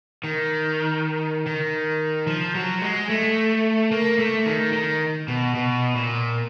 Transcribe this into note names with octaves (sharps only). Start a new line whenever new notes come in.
D#3
D#3
F3
F#3
G#3
A3
A#3
A3
D#3
D#3
B2
B2
A#2